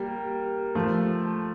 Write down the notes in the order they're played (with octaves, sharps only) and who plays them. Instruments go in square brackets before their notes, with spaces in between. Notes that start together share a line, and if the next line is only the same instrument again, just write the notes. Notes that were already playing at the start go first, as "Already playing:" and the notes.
Already playing: [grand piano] G3 A#3
F3 A3